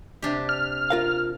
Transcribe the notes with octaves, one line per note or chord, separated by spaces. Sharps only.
C3 D4 G4
F6
F4 A#4 F5